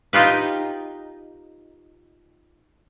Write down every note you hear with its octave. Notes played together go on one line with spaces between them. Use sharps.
D#4 F4 G4 B4